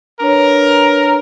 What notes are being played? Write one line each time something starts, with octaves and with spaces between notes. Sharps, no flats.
D4 A#4 B4 C#5